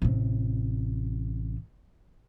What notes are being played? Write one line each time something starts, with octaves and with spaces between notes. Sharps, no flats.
A1 C3